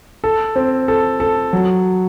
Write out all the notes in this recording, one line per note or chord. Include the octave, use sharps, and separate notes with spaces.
A4
C4
A4
A4
F#3